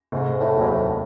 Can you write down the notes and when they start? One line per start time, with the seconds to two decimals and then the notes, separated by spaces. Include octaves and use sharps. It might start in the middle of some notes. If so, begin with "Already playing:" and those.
0.12 F1 G#2
0.40 A2
0.54 D#2 D#3 F#3
0.61 G#2
0.70 A2